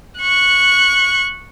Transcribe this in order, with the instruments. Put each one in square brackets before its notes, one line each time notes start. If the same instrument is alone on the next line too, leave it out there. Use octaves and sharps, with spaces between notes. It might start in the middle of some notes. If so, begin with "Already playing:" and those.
[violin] C#6 F#6